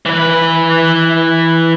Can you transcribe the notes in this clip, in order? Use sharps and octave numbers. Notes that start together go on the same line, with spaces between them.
E3 B4